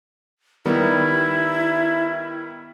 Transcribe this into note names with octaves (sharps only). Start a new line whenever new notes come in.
D#3 G3 B3 E4